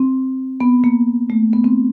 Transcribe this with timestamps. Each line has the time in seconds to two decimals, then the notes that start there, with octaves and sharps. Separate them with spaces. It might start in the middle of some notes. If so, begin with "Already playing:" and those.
Already playing: C4
0.60 B3
0.84 A#3
1.30 A3
1.53 B3
1.64 C4